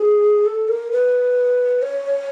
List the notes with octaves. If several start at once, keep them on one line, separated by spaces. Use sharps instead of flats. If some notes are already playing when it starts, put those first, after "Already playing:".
Already playing: G#4
A4
A#4
B4
C#5